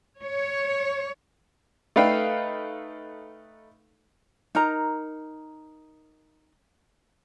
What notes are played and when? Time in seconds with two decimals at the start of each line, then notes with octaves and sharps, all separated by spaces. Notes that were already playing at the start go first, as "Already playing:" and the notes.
0.21 C#5
1.96 A3 D#4 A4 B4 F5 G5
4.55 D#4 A#4 A#5